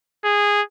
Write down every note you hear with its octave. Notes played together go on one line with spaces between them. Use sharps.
G#4